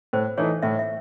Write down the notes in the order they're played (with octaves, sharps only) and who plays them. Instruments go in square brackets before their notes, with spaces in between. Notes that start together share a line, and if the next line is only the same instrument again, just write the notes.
[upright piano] A2 [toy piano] C5
[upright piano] E3 A3 D#4 [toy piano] C#5
[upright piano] A2 [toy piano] E5
[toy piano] E5